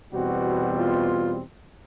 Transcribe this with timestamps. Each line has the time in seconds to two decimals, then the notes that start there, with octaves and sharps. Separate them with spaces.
0.13 E2 B2 G3 C4 F#4
0.77 F4